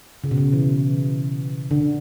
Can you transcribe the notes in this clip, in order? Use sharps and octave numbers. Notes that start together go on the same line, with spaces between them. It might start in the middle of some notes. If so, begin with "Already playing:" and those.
C#3
B2
C#3
E3
D3